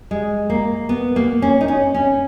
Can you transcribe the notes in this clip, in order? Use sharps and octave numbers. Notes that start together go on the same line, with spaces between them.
G#3
A#3
B3
A#3
C#4
D#4
C#4
C#4